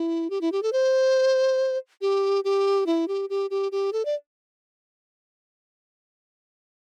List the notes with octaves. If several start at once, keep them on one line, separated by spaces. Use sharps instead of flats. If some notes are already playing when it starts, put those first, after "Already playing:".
Already playing: E4
G4
E4
G4
A4
C5
G4
G4
E4
G4
G4
G4
G4
A4
D5